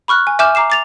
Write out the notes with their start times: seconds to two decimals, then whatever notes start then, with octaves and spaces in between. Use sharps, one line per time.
0.08 B5 C#6 F6 F#6
0.27 G#5
0.39 E5 G#5 D6 F6 G6 E7
0.55 A#5 D6 C7 E7
0.70 D6 A6 F7